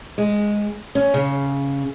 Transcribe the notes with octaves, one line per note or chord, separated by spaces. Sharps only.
G#3
C#4
C#3